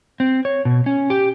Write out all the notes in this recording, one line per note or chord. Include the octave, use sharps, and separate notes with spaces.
C4
C#5
B2
C#4
G4